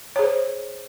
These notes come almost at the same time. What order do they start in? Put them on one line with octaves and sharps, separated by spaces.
C#5 G#4 C5